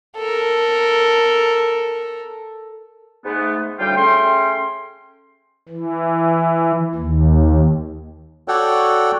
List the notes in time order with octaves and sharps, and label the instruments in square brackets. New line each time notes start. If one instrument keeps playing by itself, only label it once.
[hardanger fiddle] A4 A#4
[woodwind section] G#2 A3 B3
D2 A2 G3 F4 G5
C#3 A3 C#4 G5 C6
[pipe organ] E3
D#2
[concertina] F#4 A4 C#5 D5 F#5 G5